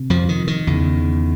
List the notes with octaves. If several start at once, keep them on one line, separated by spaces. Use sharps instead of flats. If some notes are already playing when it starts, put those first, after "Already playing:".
Already playing: C3
F2 F3
D#3
D#3
E2 C#3